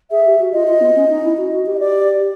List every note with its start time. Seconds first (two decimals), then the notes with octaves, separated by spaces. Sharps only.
0.11 G#4 E5
0.25 G4
0.39 F#4
0.53 F4 D#5
0.68 F4
0.81 B3
0.95 C#4
1.09 D#4
1.23 E4
1.37 F#4
1.51 F#4
1.66 G4
1.74 D#5
1.80 D5